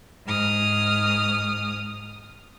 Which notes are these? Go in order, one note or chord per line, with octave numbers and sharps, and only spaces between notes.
G#2 D#6 F6